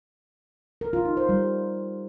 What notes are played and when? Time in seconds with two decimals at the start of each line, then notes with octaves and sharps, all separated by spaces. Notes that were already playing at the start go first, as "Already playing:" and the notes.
0.81 A#4
0.93 F4
1.05 D#4
1.17 C5
1.29 G3